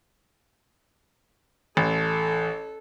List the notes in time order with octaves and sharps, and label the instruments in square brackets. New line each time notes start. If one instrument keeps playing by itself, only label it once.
[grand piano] A1 [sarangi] A4